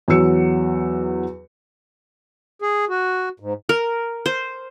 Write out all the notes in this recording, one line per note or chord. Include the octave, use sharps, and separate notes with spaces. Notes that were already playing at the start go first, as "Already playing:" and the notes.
E2 F#3 F#4 E6 C#7
G#4
F#4
G#2
A#4
C5